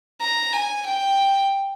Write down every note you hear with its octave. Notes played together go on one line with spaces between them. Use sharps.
A#5
G#5
G5